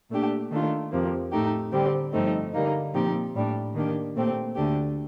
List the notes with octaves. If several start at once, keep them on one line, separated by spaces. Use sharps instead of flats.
A#2 A3 D4 G4
D#3 A3 D4 F4
F2 C3 F3 A#3
A2 A3 D#4 G4
D3 G3 C4 G4
G2 F3 A3 C4 D#4
D3 G3 A#3 D#4
A#2 F3 C4 D#4 G4
A2 G3 D4
D#3 A#3 D4 G4
A#2 A3 C4 G4
D2 D3 A3 D4 G4